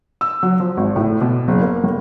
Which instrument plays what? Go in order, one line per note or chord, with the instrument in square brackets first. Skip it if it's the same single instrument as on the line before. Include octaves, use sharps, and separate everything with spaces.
[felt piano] E6
F#3
F3
G#1
A2
B2
F#1
A#3
G1